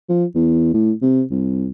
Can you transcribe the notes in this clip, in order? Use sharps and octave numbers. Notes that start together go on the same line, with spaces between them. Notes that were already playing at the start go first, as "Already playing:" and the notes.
F3
E2
A2
C3
C2